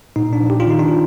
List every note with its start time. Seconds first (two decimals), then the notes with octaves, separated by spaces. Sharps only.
0.16 A#2 D#4
0.33 D4
0.41 F3
0.50 G4
0.60 F4
0.67 D#3 D#4
0.79 D4 F4